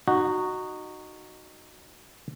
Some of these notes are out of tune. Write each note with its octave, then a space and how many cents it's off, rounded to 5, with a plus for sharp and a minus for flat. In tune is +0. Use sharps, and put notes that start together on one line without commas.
D#4 -20 F#4 +0